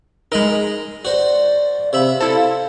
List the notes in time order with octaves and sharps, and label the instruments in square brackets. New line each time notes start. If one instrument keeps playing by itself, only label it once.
[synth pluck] G#3 A#4 [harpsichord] D#4 D#5 B5
[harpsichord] F#4 C5 [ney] D5
[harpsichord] C3 E5 B5 [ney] F5
[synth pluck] E4 A4 [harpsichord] C5